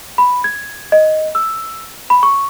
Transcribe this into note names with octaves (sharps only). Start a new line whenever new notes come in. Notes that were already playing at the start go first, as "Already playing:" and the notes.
B5
G#6
D#5
E6
B5
C#6